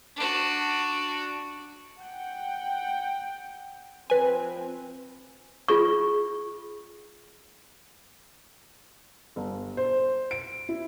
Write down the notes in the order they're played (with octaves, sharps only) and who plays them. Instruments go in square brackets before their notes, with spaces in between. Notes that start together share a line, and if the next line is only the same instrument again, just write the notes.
[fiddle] D4 F#4
[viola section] F#5 G5
[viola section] F3 C4 [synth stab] B4 G#5
[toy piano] F4 G#4 C#6
[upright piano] G1
C5
D7
E4